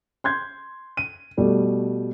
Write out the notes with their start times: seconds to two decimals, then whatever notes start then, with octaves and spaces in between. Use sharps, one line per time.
0.24 C6 G6 G#6
0.97 D#7
1.37 B2 G3 A3